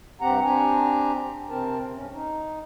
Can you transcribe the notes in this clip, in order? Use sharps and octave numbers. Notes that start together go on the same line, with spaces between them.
G2 C4 G4 F#5 A#5
C4 D4 G4 G#5 A#5
C3 C4 A#4 A5
E2 G2 C#4
D#4